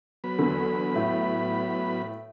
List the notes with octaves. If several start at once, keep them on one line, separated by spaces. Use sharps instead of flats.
F#3 B3 B5
E2 D3
A2